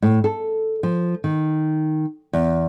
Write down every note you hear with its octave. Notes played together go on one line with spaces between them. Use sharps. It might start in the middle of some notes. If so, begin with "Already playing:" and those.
A2
A4
F3
D#3
E2